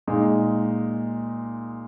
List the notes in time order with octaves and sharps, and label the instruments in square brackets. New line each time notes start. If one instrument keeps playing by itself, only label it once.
[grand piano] A#2 G#3 D#4